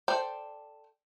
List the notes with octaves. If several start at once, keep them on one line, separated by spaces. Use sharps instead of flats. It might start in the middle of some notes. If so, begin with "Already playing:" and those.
A4 C5 D5 G5